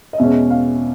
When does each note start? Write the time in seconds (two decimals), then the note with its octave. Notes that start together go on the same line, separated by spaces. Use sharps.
0.13 D#5
0.18 E2 B2 G#3 C#4 E5
0.50 F5